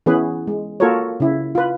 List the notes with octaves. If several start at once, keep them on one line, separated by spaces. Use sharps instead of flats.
E3 B3 C#4 G#4 B4
G#3
A#3 F4 F#4 A4 A#4 C#5
C#3 E4
F4 B4